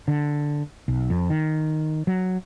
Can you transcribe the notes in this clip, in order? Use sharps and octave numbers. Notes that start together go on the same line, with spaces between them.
D3
B1
F2
D#3
F#3